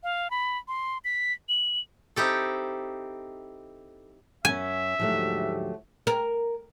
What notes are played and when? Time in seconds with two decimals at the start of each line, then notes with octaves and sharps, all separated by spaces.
0.03 F5
0.30 B5
0.68 C6
1.05 B6
1.49 F#7
2.16 C4 D#4 E4 G4 A4
4.45 F#2 C#4 E5 G#5
4.99 D2 G#2 F3 F#3 A3 G4
6.07 A#4